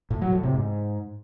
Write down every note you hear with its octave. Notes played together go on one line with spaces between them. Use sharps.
A2
F#3
A2
C3
G#2